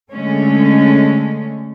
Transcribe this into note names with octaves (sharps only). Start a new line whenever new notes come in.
D3 G#3 A3 C#4